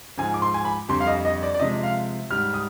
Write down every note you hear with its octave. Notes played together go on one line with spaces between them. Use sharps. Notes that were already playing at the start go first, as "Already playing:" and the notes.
G#2 F3 G#3 G#5
D6
C6
G#5
B5
F2 D3 G3 C6
F5
D#5
D#5
D5
D5
C3 F3 G#3 D#5
F5
G#2 G3 F6
D#6